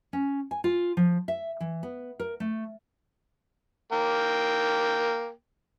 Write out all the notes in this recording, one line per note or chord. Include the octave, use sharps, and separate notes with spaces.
C#4
G#5
F4
F3
E5
E3
B3
A#4
A3
A#3 G5